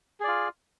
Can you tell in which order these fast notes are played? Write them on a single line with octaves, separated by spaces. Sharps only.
G#4 D5 F4